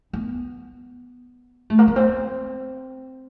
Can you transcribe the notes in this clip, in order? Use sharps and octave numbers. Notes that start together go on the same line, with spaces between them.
B3
A3
A#3
B3
C4